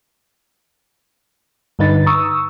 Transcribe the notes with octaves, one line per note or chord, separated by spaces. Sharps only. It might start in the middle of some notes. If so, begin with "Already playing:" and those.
G2 D3 D#4 B4 A6
A#5 C#6 D#6 E6